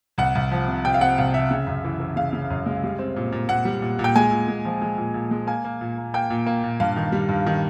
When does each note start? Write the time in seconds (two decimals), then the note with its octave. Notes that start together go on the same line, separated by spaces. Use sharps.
0.18 C2 F#5
0.35 C2
0.51 F3
0.68 C3
0.85 C3 G5
0.94 F5
1.01 C3 F#5
1.18 C2 F5
1.34 C3 E5
1.51 C#3
1.67 F#2
1.84 E3
2.00 E3
2.16 C#3 F5
2.33 C#3
2.50 F#2
2.66 G#3
2.83 G3
2.99 C4
3.16 A#2
3.32 A#2
3.48 A#2 F#5
3.65 G3
3.82 A#2
3.99 A#2
4.04 G5
4.16 G#3 G#5
4.31 A#2
4.48 G#3
4.65 F3
4.82 G#3
4.98 A#2
5.14 A#2
5.31 G#3
5.47 A#3 G#5
5.65 A#3
5.81 A#2
5.98 A#3
6.14 A#3 G5
6.30 A#2
6.46 A#3
6.64 A#2
6.80 G2 F5
6.96 D#3
7.12 G3
7.29 G2
7.46 D#3